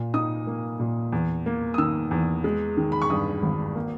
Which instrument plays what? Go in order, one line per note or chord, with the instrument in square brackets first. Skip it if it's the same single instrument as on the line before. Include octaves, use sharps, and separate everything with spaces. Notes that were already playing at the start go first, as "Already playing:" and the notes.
Already playing: [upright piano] A#2
D#4 D#6
A#3
A#2
E2
A#3
D#6
D#3 E6
E2
G#3
D#3
B5
C#6
G2 D#6
G#1
A#3